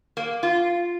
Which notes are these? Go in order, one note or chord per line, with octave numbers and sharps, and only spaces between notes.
A#3
F4